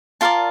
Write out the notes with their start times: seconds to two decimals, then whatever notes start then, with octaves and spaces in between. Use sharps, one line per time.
0.21 F4 A#4 D5 A5